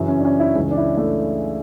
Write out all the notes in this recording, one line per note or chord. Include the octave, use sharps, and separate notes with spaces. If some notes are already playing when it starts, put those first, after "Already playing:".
Already playing: F#2 C#3 E3
C#4
D4
C#4
E4
C#2 C#3 E3 C#4
D4
E4
A3